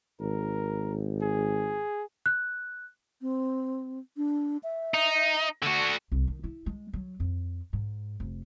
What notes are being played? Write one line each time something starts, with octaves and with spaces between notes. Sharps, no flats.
G#1 A#4
G#4
F#6
C4
D4
E5
D#4
D3 F#4
C2
D#3
E4
G#3
F#3
F2
G#2
F1